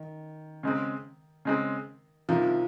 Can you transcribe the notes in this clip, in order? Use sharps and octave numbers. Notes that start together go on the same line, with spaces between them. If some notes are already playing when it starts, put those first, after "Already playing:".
Already playing: D#3
C#3 G#3 C4
C#3 G#3 C4
C2 C3 D#3 F3